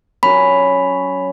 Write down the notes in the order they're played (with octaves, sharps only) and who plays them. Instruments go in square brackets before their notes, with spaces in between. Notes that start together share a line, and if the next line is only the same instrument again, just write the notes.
[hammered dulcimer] F#3 C#4 [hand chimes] B5